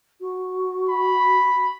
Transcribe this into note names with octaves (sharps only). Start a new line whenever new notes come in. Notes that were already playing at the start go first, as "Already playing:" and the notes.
F#4
B5